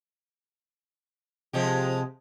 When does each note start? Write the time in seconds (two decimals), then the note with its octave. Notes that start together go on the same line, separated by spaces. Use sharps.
1.53 C3 F3 G#3 G4